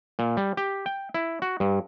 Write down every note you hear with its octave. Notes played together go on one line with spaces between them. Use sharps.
A#2
G3
G4
G5
E4
F#4
G2